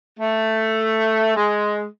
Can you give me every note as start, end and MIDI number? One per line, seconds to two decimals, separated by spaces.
0.19 1.35 57
1.36 1.86 56